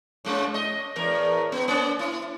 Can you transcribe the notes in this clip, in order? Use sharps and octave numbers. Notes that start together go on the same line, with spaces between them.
A2 G#3 C#4
D#5
E2 A2 A#4
B3
A#3 C#4
E4